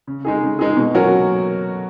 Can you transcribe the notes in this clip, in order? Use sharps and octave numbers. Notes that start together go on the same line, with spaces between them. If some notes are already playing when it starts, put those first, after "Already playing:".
C#3
G#3 D#4 G#4
C#3
G#3 D#4 G#4
B2
F#3 C#4 F#4 A#4